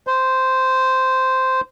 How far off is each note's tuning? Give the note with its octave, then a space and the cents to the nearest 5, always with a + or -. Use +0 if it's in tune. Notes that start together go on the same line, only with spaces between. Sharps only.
C5 -10